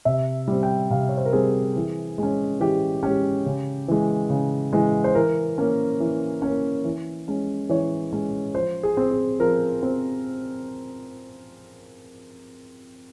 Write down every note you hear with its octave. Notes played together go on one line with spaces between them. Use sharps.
C3 E5
G3 C4
G5
C3 F5
C#5
C5
A#4
G3 C4 G#4
E3
G#3 C#4
E3 G4
G#3 C#4 G4
C#3
E3 G#3
C#3
E3 G#3
C5
E3 A#4
A#3 C#4
E3
C#4
A#3
E3
G#3 C#4
E3 C#5
G#3 C#4
F3 C5
G#4
C4
G#4
F3 A#4
C4